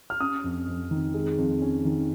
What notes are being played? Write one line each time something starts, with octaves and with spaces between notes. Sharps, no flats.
F6
C#4 D#6
F2
F2
D#3
G#3
F2
C#4
D#3